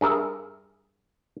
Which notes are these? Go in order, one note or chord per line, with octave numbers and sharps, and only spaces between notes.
G2 G#4 A#4 E5